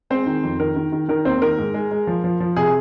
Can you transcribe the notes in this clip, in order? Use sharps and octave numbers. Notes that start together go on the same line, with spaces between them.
G#3 C4 C5
D#3
F2
D#3 A#4
D#3
D#3
D#3 A#4
D#2 C4 C5
D#3 A#4
G#2
G#3
G#3
F3
F3
F3
C3 G#4